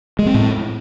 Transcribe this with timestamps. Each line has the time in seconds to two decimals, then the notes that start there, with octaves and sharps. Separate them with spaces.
0.19 G#3
0.26 C4
0.34 A2